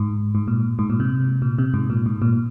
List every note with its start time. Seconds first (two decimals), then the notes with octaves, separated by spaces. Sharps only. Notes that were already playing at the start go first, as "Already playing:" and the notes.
Already playing: G#2
0.35 G#2
0.48 A#2
0.79 G#2
0.90 A#2
1.00 C3
1.42 A#2
1.59 C3
1.74 G#2
1.90 A#2
2.06 G#2
2.22 A#2